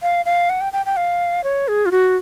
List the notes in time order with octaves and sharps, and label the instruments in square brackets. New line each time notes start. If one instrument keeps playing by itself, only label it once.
[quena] F5
F5
F#5
G5
G5
G5
F5
C#5
G#4
F4
F#4